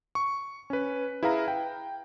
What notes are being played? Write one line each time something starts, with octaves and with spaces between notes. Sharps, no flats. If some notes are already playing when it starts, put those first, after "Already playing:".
C#6
C#4 B4
E4 G#4 B4 F5 A#5
G5